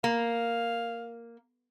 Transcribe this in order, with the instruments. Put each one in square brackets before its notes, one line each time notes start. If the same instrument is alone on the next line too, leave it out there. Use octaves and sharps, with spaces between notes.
[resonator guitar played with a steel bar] A#3 [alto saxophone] F5